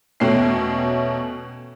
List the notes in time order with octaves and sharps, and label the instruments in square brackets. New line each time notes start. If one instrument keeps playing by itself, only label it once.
[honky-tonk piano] E2 B2 A3 C#4 G5 C7